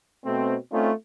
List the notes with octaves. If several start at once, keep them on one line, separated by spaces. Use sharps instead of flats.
B2 A3 C4
A3 C4 C#4 D#4 F4